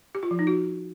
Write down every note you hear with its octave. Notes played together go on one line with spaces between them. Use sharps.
G4
F4
F3
D#4
F#4